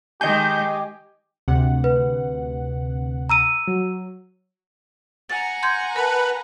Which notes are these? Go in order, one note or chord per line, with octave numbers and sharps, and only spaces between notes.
D#3 G#3 G4 D#5 G#5 G6
D2 C3 F#5
B4
A#5 E6 D#7
F#3
F#5 G#5 A#5 A6
C6 G6 G#6
A#4 B4 A5 B5